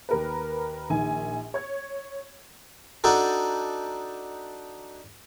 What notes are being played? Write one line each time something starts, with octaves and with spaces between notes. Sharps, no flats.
D#2 A#4 B4
A#1 D#3 G#5
C#5 G#6
D4 D#4 F#4 A4